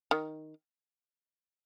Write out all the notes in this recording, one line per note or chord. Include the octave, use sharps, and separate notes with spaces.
D#3